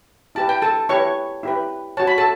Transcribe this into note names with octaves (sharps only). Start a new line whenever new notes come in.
E4 G4 B4 A5
G5
A4 A5
E4 G4 B4 C#5 C#6
E4 G4 B4
F#4 C#5 A5
B5
A4 A5